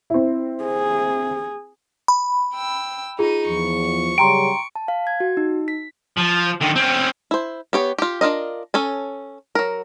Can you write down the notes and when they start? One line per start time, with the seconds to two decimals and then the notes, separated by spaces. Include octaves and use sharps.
0.10 C4 E4
0.64 G#4
2.08 B5
2.54 G5 E6
3.19 D#4 F4 G#4 D#7
3.48 E2 F3 C#6
4.18 C#3 F#3 G3 G5 A#5 C6 D7
4.75 A5
4.88 F5
5.07 G#6
5.20 F#4
5.37 D#4
5.68 B6
6.17 F3
6.61 D3 D#3
6.75 C4 C#4
7.31 E4 C5
7.73 B3 G4 C#5
7.99 F4 G4
8.21 D4 F4 A#4 D#5
8.74 C#4 A4 G#5
9.55 F#3 A#4